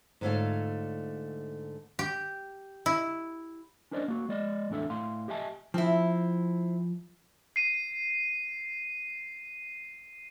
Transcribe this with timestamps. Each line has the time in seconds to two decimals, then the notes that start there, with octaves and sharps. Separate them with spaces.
0.21 G#2 D3 A3 F4 C#5 F5
1.99 G4
2.86 E4
3.91 C#4 D4 A#4 C5 D5 D#5
4.08 A#3 F#4
4.29 G#3 D5 D#5
4.70 E2 A2 D4 A4 E5
4.90 A2 F5 C6
5.28 G4 D#5 E5 G#5 A5
5.74 F3 C4 E4
7.56 C7 D#7